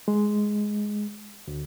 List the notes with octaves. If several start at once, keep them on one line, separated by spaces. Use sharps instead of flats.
G#3
D2